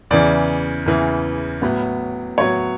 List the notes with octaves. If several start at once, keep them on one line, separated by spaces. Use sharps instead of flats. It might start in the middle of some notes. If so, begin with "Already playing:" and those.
E2 C#3 E3 D5
E2 C#3 E3
A2 F#3 B3
A2 F#3 B3 C#5